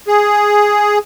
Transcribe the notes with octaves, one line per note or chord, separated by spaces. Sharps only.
G#4